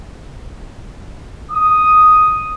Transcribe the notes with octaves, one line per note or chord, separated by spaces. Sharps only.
D#6